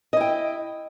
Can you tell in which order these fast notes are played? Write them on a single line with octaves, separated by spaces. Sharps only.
D#5 E4 G5